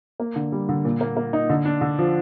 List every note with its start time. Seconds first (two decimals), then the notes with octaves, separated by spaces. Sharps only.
0.20 A#3
0.36 D3
0.52 G3
0.69 D3
0.85 A#2
1.01 A#3
1.17 A#3
1.33 D#4
1.49 D3
1.65 D4
1.81 D3
1.99 F3